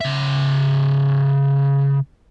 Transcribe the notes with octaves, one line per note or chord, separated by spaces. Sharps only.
C#3 E5